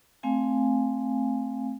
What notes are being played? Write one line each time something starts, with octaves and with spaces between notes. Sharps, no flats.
A3 C4 F5 G#5